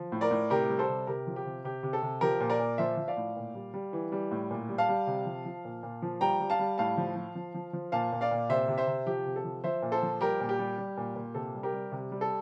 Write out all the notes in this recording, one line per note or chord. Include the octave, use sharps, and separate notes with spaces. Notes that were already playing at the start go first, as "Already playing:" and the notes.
Already playing: F3
A2
A#4 D5
A2
C3 G4 A#4
G3
A4 C5
C3
C3 G4 A#4
F3
G4
C3
C3 G4
C3
A4
C3
F3 G4 A#4
A#2
A#4 D5
A#2
F3 C5 E5
F3
D5 F5
A2
A#2
G3
G3
E3
G3
A2
A#2
G3
F5 A5
G3
C3
F3
F3
A#2
A#2
F3
G3 G5 A#5
G3
F5 A5
G3
A2 F5 A5
F3
F3
F3
F3
F3
A#2 F5 A5
A#2
D5 F5
A#2
C3 C5 E5
C3
C5 E5
C3
F3 G4
C3
A4
F3
F3 C5 E5
A#2
A4 C5
F3
G3 G4 A#4
A#2
G4
G3
G3
A#2
A#2
C3 A4
G3
G4 A#4
G3
C3
G3
A4